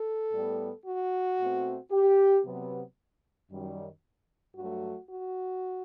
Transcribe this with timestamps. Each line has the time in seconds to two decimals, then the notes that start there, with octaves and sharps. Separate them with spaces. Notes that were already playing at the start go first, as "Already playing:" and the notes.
Already playing: A4
0.32 A2 G3 B3
0.86 F#4
1.39 B2 A3 C4
1.91 G4
2.45 C3 F#3 B3
3.51 F#2 D#3 G3
4.56 G2 F#3 A3 F#4
5.10 F#4